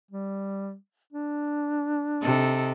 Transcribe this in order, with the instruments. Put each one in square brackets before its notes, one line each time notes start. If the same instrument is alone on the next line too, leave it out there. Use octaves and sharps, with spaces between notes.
[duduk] G3
D4
[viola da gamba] C3 D#4 A4